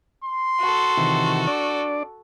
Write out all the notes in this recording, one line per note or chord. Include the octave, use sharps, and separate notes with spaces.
C6
F#4 A4
C3 D#3 E3
D4 D5